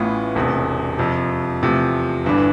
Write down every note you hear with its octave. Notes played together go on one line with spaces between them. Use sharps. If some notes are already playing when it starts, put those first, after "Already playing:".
Already playing: A1 A2 E3 B3 F4
E1 E2 C3
F2 C3 F3
E2 C3 F3 A3
G1 G2 E3 B3 D4